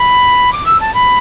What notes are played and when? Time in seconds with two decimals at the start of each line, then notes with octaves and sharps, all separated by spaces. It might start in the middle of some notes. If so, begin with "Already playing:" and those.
Already playing: B5
0.52 D6
0.66 E6
0.80 A5
0.94 B5